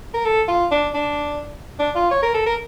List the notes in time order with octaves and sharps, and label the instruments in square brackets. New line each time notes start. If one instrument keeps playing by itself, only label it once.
[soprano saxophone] A#4
A4
F4
D4
D4
D4
F4
C#5
A#4
A4
A#4